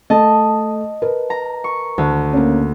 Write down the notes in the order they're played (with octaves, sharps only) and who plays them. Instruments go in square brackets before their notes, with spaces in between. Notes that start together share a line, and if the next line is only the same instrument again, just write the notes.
[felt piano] A3 [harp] D#5 A5
[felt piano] A#4 B4
[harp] A#5
C#6
D2
[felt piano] A#3 C#4